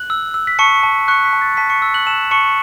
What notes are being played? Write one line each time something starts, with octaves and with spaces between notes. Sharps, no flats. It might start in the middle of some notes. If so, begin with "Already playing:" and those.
Already playing: F#6 F#7
E6
E6
B6
A5 C#6 C#7
A5
C#6 F#6 C#7
B6
A5
A6
A5 B6
C#6 C#7
E6
F#6 F#7
A5 E6 E7
A5 C#6 C#7